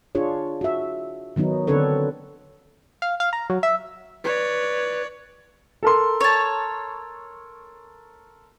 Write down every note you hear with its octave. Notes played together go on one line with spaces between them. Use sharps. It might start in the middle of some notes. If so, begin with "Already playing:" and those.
D4 F4 G#4 C#5
F#4 E5
D#3 F#3 B3 D#4
D3 C4 D4 A4 B4 C#5
F5
F5
A#5
F#3
E5
B4 C#5 D5
A4 A#4 C6
C#5 A5